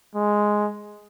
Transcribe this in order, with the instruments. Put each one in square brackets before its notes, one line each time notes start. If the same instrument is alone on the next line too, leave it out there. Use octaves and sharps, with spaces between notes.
[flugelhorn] G#3